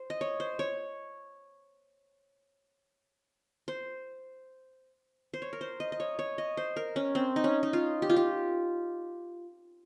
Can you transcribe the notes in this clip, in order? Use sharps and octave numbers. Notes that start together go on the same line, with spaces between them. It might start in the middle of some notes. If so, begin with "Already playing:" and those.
Already playing: C5
D#5
C#5
C5
C#5
C5
C5
C#5
A#4
C5
D#5
D#5
C#5
C#5
D#5
C5
A#4
C#4
C4
D#4
C#4
D#4
F4
G4
F4
G4